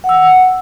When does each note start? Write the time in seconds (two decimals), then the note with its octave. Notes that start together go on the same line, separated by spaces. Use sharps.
0.04 F#5
0.09 E6
0.14 F#5